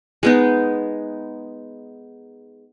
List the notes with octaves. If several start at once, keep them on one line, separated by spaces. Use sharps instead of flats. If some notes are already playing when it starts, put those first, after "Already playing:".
G#3 B3 D#4